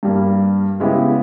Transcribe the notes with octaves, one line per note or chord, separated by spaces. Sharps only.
G2 G3 A#3
C#3 G#3 B3 E4 G4